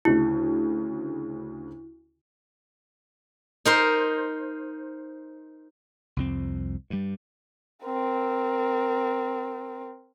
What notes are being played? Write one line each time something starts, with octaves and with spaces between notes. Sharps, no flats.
D2 C#3 E4
D#4 A#4 C5
C2 F2 C4
G2 G3
C4 A#4